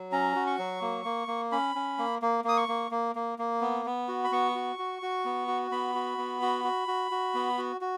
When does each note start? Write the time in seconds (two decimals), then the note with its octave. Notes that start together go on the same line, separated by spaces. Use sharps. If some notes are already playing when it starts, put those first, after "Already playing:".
Already playing: F#3
0.12 C#4 A#5
0.36 F#4
0.47 C#6
0.59 F#3
0.81 A#3
1.05 A#3
1.28 A#3
1.52 C#4 B5
1.75 C#4
1.99 A#3
2.22 A#3
2.44 A#3 D#6
2.57 C#6
2.68 A#3
2.91 A#3
3.15 A#3
3.38 A#3
3.61 B3
3.86 B3
4.08 F#4
4.24 B5
4.32 B3 C#6
4.55 F#4
4.79 F#4
5.02 F#4
5.25 B3
5.48 F#4
5.71 B3 B5
5.95 F#4
6.18 B3
6.42 F#4
6.64 F#4
6.88 F#4
7.11 F#4
7.34 B3
7.58 F#4
7.81 F#4